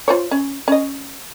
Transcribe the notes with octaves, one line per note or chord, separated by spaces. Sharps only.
F4 C5 C#5
C#4
C#4 D#5